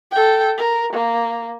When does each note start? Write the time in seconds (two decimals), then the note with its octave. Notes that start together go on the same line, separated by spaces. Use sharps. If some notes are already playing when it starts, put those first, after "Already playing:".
0.11 A4 G5
0.58 A#4
0.93 A#3